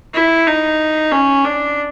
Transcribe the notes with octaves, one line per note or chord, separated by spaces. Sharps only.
E4
D#4
C#4
D4